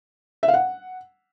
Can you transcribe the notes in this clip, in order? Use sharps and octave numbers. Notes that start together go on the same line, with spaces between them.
E5
F5
F#5